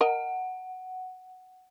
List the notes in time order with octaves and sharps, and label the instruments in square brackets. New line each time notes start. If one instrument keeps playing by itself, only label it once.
[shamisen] A#4 D#5 [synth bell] F#5